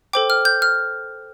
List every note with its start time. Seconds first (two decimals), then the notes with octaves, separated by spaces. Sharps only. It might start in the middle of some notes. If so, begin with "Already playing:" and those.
0.13 A4 C5 G5 D6
0.30 F6
0.45 G6
0.62 F6